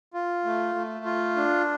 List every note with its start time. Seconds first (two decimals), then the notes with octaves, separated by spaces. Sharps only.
0.14 F4
0.45 A3
0.75 A3
1.05 F4
1.36 D4